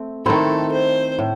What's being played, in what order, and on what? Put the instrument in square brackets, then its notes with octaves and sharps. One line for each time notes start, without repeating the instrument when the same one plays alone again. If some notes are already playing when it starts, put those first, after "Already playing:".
Already playing: [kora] A3 C4
[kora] D#3 A3 C4 E4 [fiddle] A4
[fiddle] C5
[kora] A2